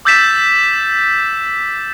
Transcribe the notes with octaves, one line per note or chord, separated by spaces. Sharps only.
D6 E6 G6 A6 B6 E7